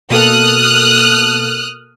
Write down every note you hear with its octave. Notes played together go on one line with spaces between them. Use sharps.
B2 A#3 A4 D#6 F6 F#6